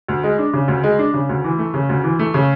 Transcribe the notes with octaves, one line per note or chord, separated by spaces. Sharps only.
D2
G#3
D4
C#3
D2
G#3
D4
C#3
D2
E3
A3
C#3
D2
E3
A3
C#3